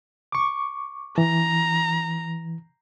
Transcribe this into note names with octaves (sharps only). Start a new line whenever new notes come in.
C#6 D6
E3 A#5